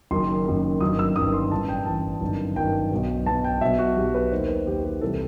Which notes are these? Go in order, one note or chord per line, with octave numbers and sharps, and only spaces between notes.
F#1 F#2 D#3 C6
F#1 F#2 D#3
G1 F#2 D#3 D#6
E6
G1 F#2 D#3 D#6
C6
A1 G2 E3 A5
G5
A1 G2 E3 A5
G1 F#2 D#3
G1 F#2 D#3 G5
B1 B2
B1 B2 A5
G5
B1 B2 E5
F#4
B1 B2 G4
B4
D#2 D#3 C5
B4
D#2 D#3 G4
G4
C2 C3 E3 A4